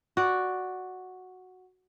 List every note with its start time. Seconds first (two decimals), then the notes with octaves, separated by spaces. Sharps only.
0.17 F#4 D5